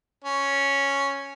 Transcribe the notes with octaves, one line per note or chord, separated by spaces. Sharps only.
C#4